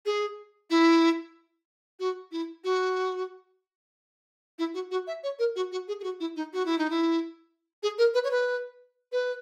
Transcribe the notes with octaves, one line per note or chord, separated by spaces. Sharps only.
G#4
E4
F#4
E4
F#4
E4
F#4
F#4
E5
C#5
A#4
F#4
F#4
G#4
G#4
F#4
E4
D#4
F#4
E4
D#4
E4
G#4
A#4
B4
C#5
B4
B4